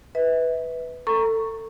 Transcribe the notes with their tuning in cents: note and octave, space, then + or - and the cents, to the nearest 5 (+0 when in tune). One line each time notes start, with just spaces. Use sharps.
B4 +0 E5 -35
A4 +25 A#5 +0 C#6 +0